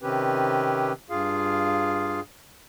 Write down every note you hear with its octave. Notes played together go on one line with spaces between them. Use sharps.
C3 D#3 C4 C#4 G4 B4
G2 F4 G#4 F5